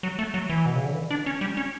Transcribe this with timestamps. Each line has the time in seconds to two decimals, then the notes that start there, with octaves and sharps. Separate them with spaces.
0.03 F#3
0.19 A3
0.34 F#3
0.50 E3
0.66 B2
0.76 C#3
0.86 D3
0.95 E3
1.11 D4
1.26 C#4
1.41 G3
1.57 C#4